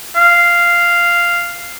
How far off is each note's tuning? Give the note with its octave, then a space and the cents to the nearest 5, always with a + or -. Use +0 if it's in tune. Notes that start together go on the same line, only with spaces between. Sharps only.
F5 -5